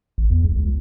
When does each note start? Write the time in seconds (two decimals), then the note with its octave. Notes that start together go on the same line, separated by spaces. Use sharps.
0.18 A1
0.30 E2
0.44 C2
0.56 C#2